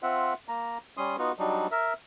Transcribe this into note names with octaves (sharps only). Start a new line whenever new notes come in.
C4 F4 E5 F#5
A#3 A#5
G3 C#4 C6 D#6
B3 D#4 F4 F#4
F#3 G3 D4 D#4
A#4 E5